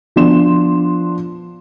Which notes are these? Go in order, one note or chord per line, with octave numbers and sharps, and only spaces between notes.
F3 B3 D4 C6 E7